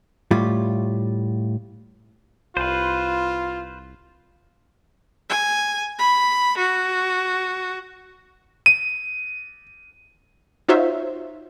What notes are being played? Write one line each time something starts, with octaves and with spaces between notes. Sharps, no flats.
A2 G3 F4
C2 F4 B4 C5
G#5
B5
F#4
D#7
D#4 F4 F#4 C5 C#5 E5